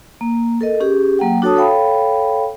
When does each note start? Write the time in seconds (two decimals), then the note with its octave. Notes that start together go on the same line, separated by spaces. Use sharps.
0.21 A#3
0.61 A4 A#4 D#5
0.80 C#4 G4 G#4
1.19 F#3 A#3 F#5 G5
1.42 D4 F#4 A4 C#5 A5 D#6
1.56 A4 C#5 F5 G5 B5